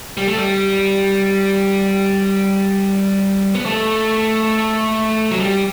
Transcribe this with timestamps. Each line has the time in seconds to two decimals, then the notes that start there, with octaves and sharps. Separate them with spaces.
0.17 G3
0.27 A3
0.37 G3
3.55 B3
3.66 A3
5.31 F#3
5.40 G3